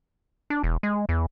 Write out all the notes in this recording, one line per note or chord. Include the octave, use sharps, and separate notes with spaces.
D4
E1
G#3
E2